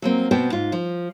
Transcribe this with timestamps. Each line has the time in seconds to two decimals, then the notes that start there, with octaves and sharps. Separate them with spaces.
0.02 F#3 A#3 C4
0.31 B2 B3 C4 C5 G5
0.52 G#2 F4
0.72 F3